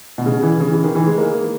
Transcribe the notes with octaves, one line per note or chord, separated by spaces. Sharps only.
B2
C#3
E3
C#3
E3
D#3
E3
G#3
A#3